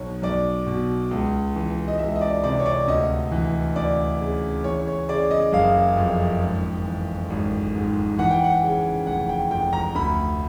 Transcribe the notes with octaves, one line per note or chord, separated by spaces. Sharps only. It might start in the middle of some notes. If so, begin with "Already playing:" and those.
Already playing: B1 B2 C#5
B1 D5
B2
C#2
E3
D#5
C#2 E5
D#5
D5
C3 D5
C#5
D5
D2 D#5
E3
D2 D5
C#3
E3 C#5
C#5
C#3 D5
D#5
F#1 F5
F2
G#1
E3
G#1
G#2
E3 F#5
G5
F#5
C#3
F1 F#5
G5
F2 G5
A#5
D2 B5